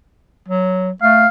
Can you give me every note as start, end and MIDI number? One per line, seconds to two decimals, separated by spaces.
0.48 0.90 54
1.02 1.26 57
1.02 1.28 77